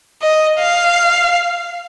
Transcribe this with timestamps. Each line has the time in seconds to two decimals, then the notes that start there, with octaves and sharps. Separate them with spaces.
0.22 D#5
0.58 F5